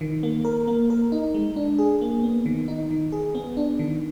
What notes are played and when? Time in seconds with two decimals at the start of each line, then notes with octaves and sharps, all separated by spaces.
0.01 D#3
0.23 A#3
0.45 A#4
0.68 A#3
0.90 A#4
1.12 D#4
1.34 G#3
1.56 D4
1.79 G#4
2.01 A#3
2.23 B3
2.46 D#3
2.68 D#4
2.91 D#3
3.12 G#4
3.35 B3
3.57 D4
3.79 D#3